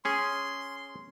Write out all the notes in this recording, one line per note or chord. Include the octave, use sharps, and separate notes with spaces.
C#4 G#4 C6